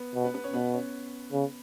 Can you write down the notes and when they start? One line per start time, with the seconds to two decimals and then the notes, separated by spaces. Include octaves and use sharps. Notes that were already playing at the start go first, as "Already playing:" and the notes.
Already playing: B3 B4
0.15 B2
0.24 B3 B4
0.34 B3 B4
0.44 C#4 C#5
0.54 B2 B3 B4
0.74 C#4 C#5
1.32 C#3